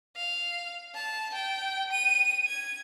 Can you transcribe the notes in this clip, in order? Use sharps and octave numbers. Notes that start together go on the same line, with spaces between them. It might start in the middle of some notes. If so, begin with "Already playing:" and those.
F5
A5
G5
D#7
G#6